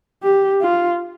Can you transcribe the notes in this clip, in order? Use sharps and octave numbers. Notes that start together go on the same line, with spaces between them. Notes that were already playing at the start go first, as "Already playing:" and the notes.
G4
F4